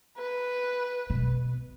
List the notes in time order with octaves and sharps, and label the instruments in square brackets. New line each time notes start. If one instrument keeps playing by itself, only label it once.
[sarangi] B4
[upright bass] B2